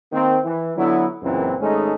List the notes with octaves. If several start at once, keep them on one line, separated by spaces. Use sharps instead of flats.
D#3 A#3 C4
E3
D3 F#3 B3 E4
C#2 F#2 A#2 E3 C4
G#1 G#3 A3 C#4 D#4